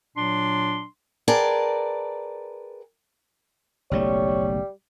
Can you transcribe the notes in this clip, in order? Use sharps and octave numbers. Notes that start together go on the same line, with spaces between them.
A#2 F#3 D4 C6
G#4 A#4 B4 D5 G5 A5
F#1 B1 G3 A3 C#5